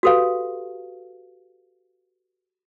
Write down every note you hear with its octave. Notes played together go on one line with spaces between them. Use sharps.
F#4 G4 A4 B4 F5